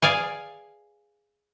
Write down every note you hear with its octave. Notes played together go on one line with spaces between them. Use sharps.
G#4 D5 F5 G#5